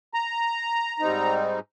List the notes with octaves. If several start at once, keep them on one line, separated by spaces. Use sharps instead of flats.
A#5
G#2 G3 C4 D#4